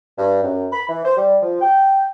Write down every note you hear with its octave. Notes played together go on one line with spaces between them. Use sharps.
G2
F#2
B5
E3
C5
G3
F3
G5